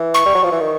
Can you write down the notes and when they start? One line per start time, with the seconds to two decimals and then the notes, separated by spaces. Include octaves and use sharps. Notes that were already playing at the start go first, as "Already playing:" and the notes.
Already playing: E3
0.14 C#6
0.26 G3
0.35 F#3
0.43 F3
0.52 E3
0.60 D#3